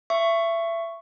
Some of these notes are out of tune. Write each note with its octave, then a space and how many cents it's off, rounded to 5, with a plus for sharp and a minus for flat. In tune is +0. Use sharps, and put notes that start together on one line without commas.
E5 +25 C#6 +0